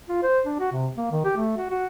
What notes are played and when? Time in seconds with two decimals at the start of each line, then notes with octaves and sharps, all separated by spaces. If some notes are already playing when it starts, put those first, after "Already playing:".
0.09 F4
0.23 C5
0.46 D4
0.59 F#4
0.72 C3
0.97 A#3
1.12 D#3
1.25 G4
1.37 A3
1.57 F#4
1.71 F#4